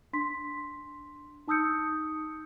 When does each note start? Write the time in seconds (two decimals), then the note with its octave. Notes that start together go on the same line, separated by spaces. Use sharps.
0.13 D4 C6 B6
1.48 D#4 A5 D#6 E6 G6 C#7